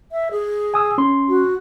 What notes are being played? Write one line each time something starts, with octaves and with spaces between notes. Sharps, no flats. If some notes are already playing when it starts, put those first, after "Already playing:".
E5
G#4
G#5 D#6 E6
C#4 C6
F#4